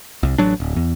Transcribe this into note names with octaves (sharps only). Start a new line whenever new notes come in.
C2
A1 F#3 D4
D1
E2